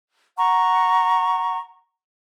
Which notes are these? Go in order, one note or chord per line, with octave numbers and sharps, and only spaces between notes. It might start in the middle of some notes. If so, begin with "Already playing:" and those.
F#5 A#5 C#6